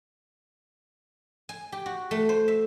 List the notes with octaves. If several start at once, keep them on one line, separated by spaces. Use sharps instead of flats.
G#5
G4
F#4
A3
C5
E5